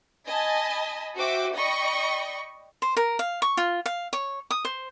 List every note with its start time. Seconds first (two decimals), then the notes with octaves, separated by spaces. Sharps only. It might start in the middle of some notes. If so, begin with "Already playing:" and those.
0.25 D#5 G#5 A5 B5
1.15 F#4 C5 E5 G5 D6
1.55 D5 D#5 G5 B5 C#6
2.82 C5
2.97 A#4
3.19 F5
3.42 C#6
3.57 F4
3.86 F5
4.13 C#5
4.51 D#6
4.65 C5